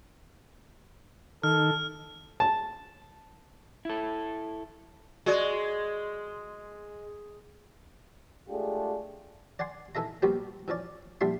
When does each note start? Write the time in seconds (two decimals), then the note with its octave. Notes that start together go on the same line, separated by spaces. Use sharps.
1.43 D#3 A4 F6
2.40 A5
3.85 E4 A4
5.26 G#3 F#4 D5 D#5
8.49 G#3 A3 D4 F4 G4 G#4
9.59 D5 F#5 G#5 C6
9.95 E3 D#4 A4 E5 A#5
10.22 A#2 F3 G3 B3 F#4 G4
10.68 E3 F3 C#4 D5
11.21 A#1 G3 D4 E4 E5 C6